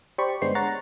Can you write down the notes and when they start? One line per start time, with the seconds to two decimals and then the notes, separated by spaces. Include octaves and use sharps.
0.18 G4 C5 D5 B5 C#6
0.42 G1 G#3 B3 D4 C5 C7
0.55 C#5 F#5 A#5 A6